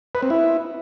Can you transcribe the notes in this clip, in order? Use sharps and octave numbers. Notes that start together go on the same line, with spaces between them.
B4
C4
E4